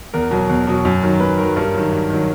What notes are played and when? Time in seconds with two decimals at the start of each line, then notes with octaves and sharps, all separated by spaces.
0.14 E2 A#4
0.31 B2 F#3
0.49 E2
0.67 B2 F#3
0.85 F#2
1.03 D#3 F#3
1.20 F#2 B4
1.38 D#3 F#3 A#4
1.56 G2 A#4
1.74 D#3 F#3
1.92 G2
2.10 D#3 F#3